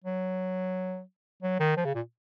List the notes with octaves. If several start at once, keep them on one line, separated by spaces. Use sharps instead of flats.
F#3
F#3
D#3
F3
C#3
A#2